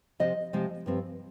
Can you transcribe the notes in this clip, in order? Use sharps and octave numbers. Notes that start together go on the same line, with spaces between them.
C3 F3 C4 D#5
C3 F3 G#3 C4
G2 F3 C4